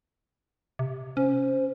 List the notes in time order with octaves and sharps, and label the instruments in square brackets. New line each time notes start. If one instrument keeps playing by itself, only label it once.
[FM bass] C3
[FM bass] C#4 [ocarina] C5